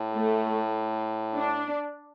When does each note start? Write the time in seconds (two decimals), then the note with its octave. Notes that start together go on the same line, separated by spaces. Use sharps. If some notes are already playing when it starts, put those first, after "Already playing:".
Already playing: A2
0.13 A3
1.36 D4